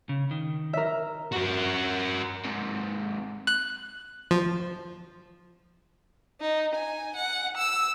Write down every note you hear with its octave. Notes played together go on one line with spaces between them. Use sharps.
C#3
D#3
A#4 E5
F#4 A#4
G#2 C3
F#6
F3
D#4
G#5
F#5
E6